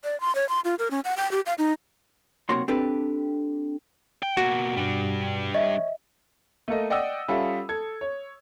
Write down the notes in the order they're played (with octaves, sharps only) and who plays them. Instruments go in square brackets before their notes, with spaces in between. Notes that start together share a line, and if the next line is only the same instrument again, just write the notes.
[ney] D5
C6
C#5
C6
F4
A#4
C#4
F#5
G5
G4
F5
D#4
[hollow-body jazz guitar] B1 C3 A#3 F#4 C#5 C6
C4 D4 G4 A4 B4
[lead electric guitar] G5
[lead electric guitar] B2 A#3 [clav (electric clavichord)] F#4
[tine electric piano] G2 B2 [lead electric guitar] G3 D4
[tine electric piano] C#5 [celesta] D#5 E5
[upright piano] A3 A#3 A4 D#5
D5 D#5 F#5 G5 D#6 E6
G3 C#4 F4 A4 E5 F#5
A4 G#6
C#5